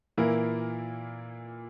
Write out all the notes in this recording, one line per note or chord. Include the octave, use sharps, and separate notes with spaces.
A#2 E3 A#3 E4 A#4